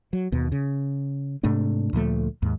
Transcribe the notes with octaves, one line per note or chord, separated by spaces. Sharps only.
F#3
D#2 B2
C#3
G#2 C3 A3 D4
D2 A#2 F3 A3
D#2 G#2